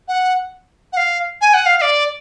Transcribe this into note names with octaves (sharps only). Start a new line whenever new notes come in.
F#5
F#5
F5
G#5
F#5
F5
F5
D5